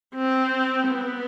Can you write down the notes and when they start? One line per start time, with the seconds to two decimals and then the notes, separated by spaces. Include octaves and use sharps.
0.14 C4
0.89 B3